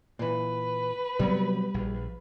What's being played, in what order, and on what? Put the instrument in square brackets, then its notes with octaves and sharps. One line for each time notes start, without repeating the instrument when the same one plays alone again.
[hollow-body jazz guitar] A#2 E3 [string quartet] B4
[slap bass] C3 F#3 B3 [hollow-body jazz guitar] G3
[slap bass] A#1